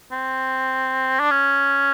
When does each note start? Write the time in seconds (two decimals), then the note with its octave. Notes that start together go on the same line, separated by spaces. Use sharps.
0.12 C4
1.20 D4
1.31 C#4